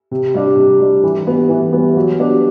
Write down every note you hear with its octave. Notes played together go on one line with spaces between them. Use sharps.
C3
G3 D4
C3
G3 D4
E3
G3 B3
E3
G3 B3
F#3
B3 D4 G4